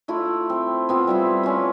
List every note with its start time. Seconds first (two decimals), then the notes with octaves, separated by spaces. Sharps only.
0.08 A3 E4 F4
0.50 C4
0.89 B3 C4 F4
1.07 G3 E4 F4
1.43 C#4 F4